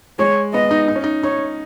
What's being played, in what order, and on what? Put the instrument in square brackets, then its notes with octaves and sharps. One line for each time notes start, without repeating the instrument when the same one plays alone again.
[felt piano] G#3 [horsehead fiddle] C#5
[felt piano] B3 [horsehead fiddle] D#5
[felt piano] D#4
D#4
C#4
D#4
[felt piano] D#4 [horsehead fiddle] C#5